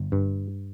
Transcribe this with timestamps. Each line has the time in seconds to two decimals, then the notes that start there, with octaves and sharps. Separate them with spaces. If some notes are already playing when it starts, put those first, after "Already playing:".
Already playing: G1
0.12 G2